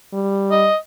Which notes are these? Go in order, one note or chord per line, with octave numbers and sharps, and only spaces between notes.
G3
D#5